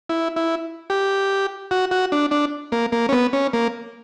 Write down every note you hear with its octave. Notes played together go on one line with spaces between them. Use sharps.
E4
E4
G4
F#4
F#4
D4
D4
A#3
A#3
C#4
B3
C#4
A#3